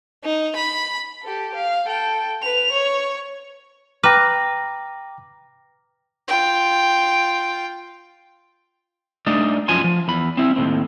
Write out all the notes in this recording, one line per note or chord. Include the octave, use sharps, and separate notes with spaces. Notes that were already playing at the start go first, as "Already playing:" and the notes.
D#4
B5
G4 A4
F5
A4 G5
B4 F7
C#5
B4 G5 A#5 D6 F6 A#6
F4 G5
A3 D4 D#4 D5
F#2 F3 G#5 C6
F3
E2 B5
C4 E4
D#2 A2 C4